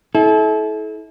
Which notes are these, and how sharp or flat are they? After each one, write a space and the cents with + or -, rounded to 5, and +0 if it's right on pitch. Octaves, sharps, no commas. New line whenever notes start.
E4 -30 A4 -35